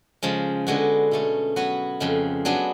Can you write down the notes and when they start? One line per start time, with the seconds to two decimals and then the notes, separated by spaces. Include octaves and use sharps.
0.23 C#3 F3 G#3
0.67 D3 G#3 B3 F#4
1.11 B2 A3 C#4
1.56 F#3 B3 F#4 B4
2.00 F2 C#3 G#3
2.45 F#3 B3 D4 G#4